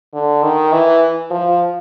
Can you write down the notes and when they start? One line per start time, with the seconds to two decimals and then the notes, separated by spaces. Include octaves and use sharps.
0.14 D3
0.43 D#3
0.72 E3
1.31 F3